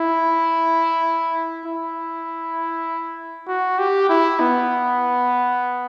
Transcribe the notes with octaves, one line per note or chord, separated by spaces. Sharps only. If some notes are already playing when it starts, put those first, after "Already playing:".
Already playing: E4
E4
F#4
G4
E4
B3